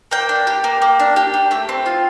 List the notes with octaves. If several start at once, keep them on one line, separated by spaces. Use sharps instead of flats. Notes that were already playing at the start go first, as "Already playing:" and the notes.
A#3 G5
D4
G4
A#3
A#3
D4
G4
A#3
A3 G5
C4
F4